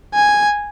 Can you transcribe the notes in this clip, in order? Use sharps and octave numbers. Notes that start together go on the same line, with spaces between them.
G#5